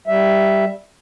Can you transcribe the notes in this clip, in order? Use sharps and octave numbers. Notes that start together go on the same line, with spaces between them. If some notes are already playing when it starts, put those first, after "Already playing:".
G3 E5